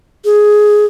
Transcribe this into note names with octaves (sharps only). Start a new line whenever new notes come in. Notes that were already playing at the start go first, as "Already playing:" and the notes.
G#4